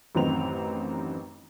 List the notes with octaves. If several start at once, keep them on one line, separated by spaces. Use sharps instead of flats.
A1 F#2 D#3 C4 B4 F7